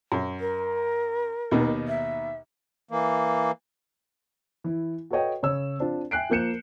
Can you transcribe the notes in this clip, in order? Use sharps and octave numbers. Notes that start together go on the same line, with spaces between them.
F#2
A#4
D#2 B2 D#3
E5
E3 A#3
E3 E4
F#4 A4 B4 C#5 D#5 G5
C#3 C#5 E6
C4 D4 F4
E5 G5 G#5 F#6 C7 D7
F3 A#3 G6 C#7 E7